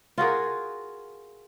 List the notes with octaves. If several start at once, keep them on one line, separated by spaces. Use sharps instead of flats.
F4 F#4 G#4 A#4